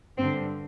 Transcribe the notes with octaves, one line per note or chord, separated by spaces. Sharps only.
G2 D3 C4